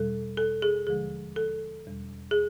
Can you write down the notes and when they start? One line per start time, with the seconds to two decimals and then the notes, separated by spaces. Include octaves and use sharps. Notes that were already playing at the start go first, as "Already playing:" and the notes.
Already playing: E2 B2 G3 A4
0.37 A4
0.62 G#4
0.87 D#2 D3 F3 G#3 G#4
1.36 A4
1.86 E2 B2 G3
2.31 G#4